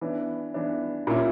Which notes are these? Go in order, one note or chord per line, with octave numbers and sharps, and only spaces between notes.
E3 B3 D4
E3 B3 D4
A#2 A#3 C#4 E4